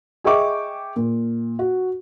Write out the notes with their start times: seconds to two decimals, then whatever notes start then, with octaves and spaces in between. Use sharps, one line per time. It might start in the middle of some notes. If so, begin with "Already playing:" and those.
0.24 G#4 D#5 E5 G5 C#6 D6
0.96 A#2
1.59 F#4